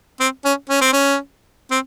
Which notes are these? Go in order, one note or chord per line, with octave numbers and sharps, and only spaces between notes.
C4
C#4
C#4
C4
C#4
C4